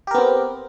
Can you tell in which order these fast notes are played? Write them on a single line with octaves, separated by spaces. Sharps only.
G4 A#4 B3 C4